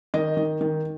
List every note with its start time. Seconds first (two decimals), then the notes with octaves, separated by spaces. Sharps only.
0.14 D#3 D#5
0.37 D#3
0.61 D#3